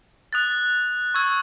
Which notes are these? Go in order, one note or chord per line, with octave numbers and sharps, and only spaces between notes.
D#6 F#6 A6
C#6 E6 G#6